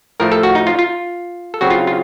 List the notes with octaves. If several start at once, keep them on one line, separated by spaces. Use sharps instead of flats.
A2 F3 A3 A#4
A4
F#4
D#4
F4
F4
A4
C#3 F#3 C4 F#4
F4
F4